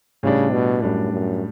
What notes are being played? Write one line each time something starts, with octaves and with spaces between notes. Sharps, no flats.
A2 C#3 G3 D4
B2
F#2 A2 G3 D4
F#2